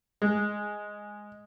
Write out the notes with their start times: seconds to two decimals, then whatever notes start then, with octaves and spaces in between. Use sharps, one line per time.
0.22 G#3